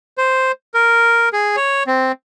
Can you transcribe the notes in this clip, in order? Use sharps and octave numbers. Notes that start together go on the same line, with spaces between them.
C5
A#4
G#4
C#5
C4